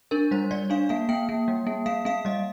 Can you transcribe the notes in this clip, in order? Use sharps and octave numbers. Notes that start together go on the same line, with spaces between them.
D4 A#4
G3 C5
G3 D5
D4 F5
A#3 F5
A#3 G5
A#3
G3
A#3
A#3 F5
A#3 F5
G3 D#5